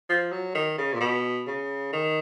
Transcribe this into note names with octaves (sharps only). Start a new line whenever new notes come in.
F3
F#3
D#3
C#3
A#2
B2
C#3
D#3